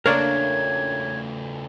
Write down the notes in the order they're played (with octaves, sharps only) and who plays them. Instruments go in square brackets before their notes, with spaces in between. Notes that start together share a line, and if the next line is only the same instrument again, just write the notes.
[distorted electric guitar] C#3 A3 [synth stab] A#3 D4 [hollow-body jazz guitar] A#4 C#5 D5 [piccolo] G#6